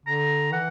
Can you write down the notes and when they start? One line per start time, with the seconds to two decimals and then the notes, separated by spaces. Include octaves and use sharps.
0.06 D3 A#5
0.52 E3 F#5